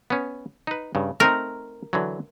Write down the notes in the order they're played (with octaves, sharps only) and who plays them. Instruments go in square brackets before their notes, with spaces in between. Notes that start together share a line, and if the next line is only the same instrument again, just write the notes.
[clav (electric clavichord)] B3 C#4
D#4 B4
G2 C#3
[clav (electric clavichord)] A3 C4 D#4 [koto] A#4
[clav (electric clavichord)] D3 E3 F#3